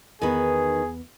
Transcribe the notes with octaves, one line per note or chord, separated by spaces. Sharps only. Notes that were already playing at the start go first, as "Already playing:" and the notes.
E2 D#3 B3 G#4 B4